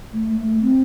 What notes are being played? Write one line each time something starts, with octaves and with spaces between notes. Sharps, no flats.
A3
A3
C4